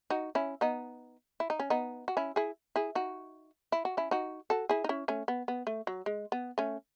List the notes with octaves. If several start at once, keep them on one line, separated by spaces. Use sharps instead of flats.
D#4 F#4
C#4 E4
B3 D#4
E4
D#4
C#4
B3 D#4
F#4
C#4 E4
E4 G#4
E4 G#4
D#4 F#4
E4
F#4
C#4 E4
D#4 F#4
F#4 A4
E4 G#4
D#4
C#4 E4
A3 C#4
B3
B3
A3
F#3
G#3
B3
A3 C#4